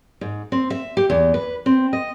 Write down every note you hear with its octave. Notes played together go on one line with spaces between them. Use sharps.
G#2
C4
E5
G4
E2
B4
C4
D#5